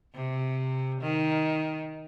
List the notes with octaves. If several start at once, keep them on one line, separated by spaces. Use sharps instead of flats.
C3
D#3